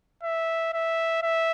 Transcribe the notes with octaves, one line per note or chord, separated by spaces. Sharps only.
E5
E5
E5